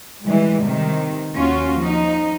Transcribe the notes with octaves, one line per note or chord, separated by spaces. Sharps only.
E3 G3 G#3
C3 D#3
D#2 C#4 F4 F#4
F3 D#4